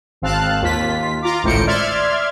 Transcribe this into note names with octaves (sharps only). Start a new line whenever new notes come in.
G#1 C4 F5 A5 F#6
D#2 F4 B6
F4 A#5 D6
G#1 C#2 A2 C5 C#7 D7
D5 E5 C6 F6 G#6